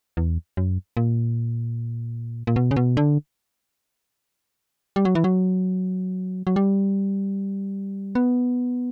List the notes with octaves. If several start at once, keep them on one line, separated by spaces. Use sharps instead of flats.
E2
F#2
A#2
A#2
B2
C#3
B2
D3
G3
F#3
E3
F#3
F#3
G3
B3